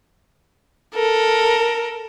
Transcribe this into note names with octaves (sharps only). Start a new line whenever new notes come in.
A4 A#4